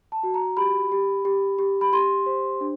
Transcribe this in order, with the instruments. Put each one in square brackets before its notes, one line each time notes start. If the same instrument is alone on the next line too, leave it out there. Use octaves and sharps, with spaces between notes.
[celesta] A5
F#4
A#5
G4 B5
G4
G4
G4
B5
G4 C6
C5
D4